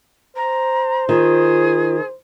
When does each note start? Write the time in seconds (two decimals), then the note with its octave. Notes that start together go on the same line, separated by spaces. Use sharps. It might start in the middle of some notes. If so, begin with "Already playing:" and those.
0.36 C5 A#5
1.09 D#3 F4 G#4